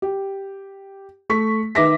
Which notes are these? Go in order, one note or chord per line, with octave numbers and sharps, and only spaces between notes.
G4
A3 C#6 B6
D#3 B4 E5 D6 A#6 B6